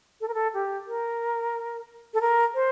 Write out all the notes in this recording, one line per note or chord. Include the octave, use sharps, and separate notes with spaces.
A4
A#4
A4
G4
A#4
A4
A#4
C5